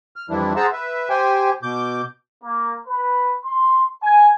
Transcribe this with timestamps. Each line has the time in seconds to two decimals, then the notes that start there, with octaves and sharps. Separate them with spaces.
0.16 F6
0.30 F2 E3 F3 G3 D4 E4
0.56 G#4 C5 F#5 A5 A#5 E6
0.73 B4 E5
1.10 G4 C5 G5 G#5
1.63 B2 D6 G6
2.44 A#3
2.87 B4
3.45 C6
4.02 G#5